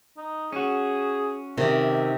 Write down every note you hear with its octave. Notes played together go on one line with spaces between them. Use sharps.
D#4
C#4 F#4 G#4
C3 D#3 D5 E5